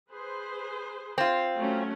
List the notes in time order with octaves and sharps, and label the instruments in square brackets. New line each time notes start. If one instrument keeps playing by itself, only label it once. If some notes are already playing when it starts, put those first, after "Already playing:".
[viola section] G#4 B4 C5
[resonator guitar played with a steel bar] C4 F4
[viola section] F#3 A3 C#4